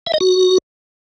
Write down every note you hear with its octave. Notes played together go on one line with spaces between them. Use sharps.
E5
D#5
F#4